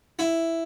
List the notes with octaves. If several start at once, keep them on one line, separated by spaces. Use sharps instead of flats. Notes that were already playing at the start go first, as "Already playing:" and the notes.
E4